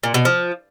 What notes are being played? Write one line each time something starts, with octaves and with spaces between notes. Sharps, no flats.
A#2
B2
F3